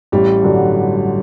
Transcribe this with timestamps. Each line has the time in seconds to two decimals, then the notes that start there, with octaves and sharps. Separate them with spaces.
0.12 A1 G3
0.42 G2 D3 F#3